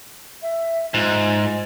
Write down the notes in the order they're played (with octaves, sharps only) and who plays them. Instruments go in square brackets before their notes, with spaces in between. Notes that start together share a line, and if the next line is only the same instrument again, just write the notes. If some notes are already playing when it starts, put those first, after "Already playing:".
[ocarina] E5
[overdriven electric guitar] G#2 [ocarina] F4